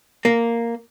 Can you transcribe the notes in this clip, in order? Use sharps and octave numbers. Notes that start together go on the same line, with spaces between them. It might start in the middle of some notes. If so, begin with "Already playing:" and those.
A#3